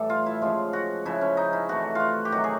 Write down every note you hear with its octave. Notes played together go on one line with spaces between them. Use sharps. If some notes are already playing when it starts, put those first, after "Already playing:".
Already playing: A2 E3 G3 A4
F4
E4
C#3 F3 G#3 F4
F#4
C#3 F3 G#3 E4
C#4
D#4
E4
C3 E3 A3 F#4
F4 F#4
G4
C3 D#3 F#3 F#4
G#4